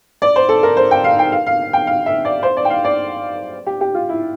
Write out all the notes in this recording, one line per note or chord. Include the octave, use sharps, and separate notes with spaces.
D5
C5
A4
A#4
C5
G5
F5
G5
F5
F5
G5
F5
E5
D5
C5
D5
G5
F5
D5
G4
G4
F4
E4